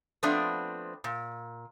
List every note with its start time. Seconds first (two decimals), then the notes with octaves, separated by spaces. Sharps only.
0.23 F3 A3 B3 C4 D4 D5
1.04 A#2